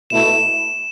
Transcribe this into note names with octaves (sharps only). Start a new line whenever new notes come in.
B2 A3 E4 E7